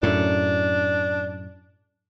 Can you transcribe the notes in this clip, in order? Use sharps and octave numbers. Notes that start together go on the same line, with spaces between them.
F#2 A2 D4